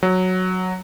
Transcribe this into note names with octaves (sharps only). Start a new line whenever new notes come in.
F#3